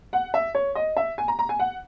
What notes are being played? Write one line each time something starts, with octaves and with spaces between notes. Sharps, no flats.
F#5
E5
C#5
D#5
E5
G#5
A#5
A#5
G#5
F#5